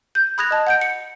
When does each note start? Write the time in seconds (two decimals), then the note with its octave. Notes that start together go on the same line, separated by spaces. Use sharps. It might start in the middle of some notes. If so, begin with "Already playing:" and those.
0.15 G6
0.38 B5 D#6 F#6 G#6 A#6 F7
0.51 D#5 A5
0.67 F#5 G6 D7
0.81 C#7